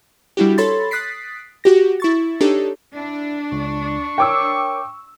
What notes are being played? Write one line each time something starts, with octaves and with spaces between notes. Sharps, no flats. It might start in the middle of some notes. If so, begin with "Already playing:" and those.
G3 D4 E4 F#4 G4
A4 C#5 B5 C6 A6
D#6 F#6 A6 B6 C7 D7
F#4 G4 A#6
E4 C#6 A6
D4 D#4 G4 A4 C#5
D4 E4
C#2 C#6
A#4 C#5 G5 D6 E6